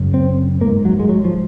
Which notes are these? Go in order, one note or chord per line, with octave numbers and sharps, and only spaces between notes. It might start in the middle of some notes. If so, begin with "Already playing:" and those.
Already playing: F#2 C#3
C4
G#2 A#3
F#3
G#3
F#3
F3